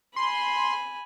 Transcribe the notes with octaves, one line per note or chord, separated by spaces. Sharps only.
G#5 B5 C6